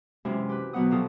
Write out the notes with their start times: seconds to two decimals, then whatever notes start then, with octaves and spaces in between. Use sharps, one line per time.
0.25 F#2 C3 E3 G#3
0.49 G4 B4
0.73 B2 D#3 F#3 B3 F#5 D#6
0.90 C3 F3 F4 A4 D#6